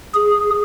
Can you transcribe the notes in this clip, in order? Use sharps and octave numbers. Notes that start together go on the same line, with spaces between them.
G#4